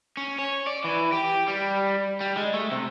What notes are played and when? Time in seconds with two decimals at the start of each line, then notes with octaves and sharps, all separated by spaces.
0.17 C#4
0.39 C#5
0.67 D5
0.84 E3
1.12 G4
1.48 G3
2.21 G3
2.37 G#3
2.54 A3
2.72 C3